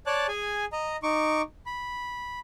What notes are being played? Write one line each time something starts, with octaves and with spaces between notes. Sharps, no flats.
C#5 D5 A5 F#6
G#4 G#5
D#5 A#5
D#4 C#6 D6
B5